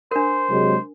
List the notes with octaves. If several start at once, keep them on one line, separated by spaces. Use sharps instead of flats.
D4 A#4 C5
C3 F#3 G#3